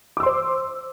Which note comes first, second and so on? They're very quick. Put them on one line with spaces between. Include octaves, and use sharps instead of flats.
D6 E6 C6 C5